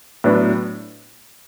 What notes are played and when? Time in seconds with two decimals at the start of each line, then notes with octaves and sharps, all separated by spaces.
0.24 A2 F#3 B3 D4